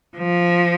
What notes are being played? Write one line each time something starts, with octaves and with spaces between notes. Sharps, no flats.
F3